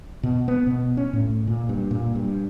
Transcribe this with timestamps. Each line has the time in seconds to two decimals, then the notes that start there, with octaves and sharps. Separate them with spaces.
0.23 B2
0.48 B3
0.67 B2
0.97 C#4
1.13 A2
1.47 A#2
1.69 G2
1.91 A#2
2.15 G2